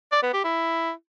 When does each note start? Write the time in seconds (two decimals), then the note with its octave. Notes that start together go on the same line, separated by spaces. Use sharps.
0.12 D5
0.23 B3
0.33 G4
0.44 E4